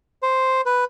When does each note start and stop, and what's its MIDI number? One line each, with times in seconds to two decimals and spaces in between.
0.23 0.61 72
0.66 0.84 71